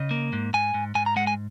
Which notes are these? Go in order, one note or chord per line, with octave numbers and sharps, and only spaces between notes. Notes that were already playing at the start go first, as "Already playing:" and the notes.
Already playing: C#3 D#5
A#3
G#2
G#2 G#5
G#2
G#2 G#5
A#5
G#3 F#5
G#5